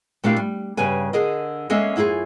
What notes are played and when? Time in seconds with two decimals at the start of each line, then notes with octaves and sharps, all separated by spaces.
0.24 A#2 A3 D4 E4 G4 F5
0.37 G3
0.77 G2 C#3 G3 B4 G#5
1.13 D3 G#4 A#4 D#5
1.70 G#3 A#3 C#4 A4 D#5 E5
1.96 F#2 E4 F4 G4 G#4